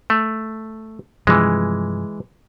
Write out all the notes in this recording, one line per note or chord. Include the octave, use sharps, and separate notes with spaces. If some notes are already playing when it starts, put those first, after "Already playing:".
A3
G2 C3 E3 F3 G#3